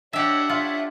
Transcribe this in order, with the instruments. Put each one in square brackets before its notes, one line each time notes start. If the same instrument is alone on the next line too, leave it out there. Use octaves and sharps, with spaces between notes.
[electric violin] D4 F#5 [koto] G4 E5 [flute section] C#5 D#5
[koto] F4 [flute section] C#5 E5